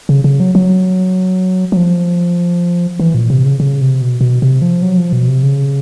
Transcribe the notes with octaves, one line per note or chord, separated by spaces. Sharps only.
C#3
C#3
F#3
F#3
F#3
F3
E3
A#2
C3
C#3
C#3
C3
B2
B2
C3
F3
F#3
F3
B2
C3
C#3